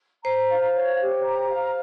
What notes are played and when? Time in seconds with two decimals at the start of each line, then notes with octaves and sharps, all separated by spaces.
0.24 C5 A#5
0.50 F5
0.75 C#5
1.00 G4
1.24 A#5
1.50 F5